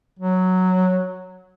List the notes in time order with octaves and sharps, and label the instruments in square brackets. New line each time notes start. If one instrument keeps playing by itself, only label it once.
[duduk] F#3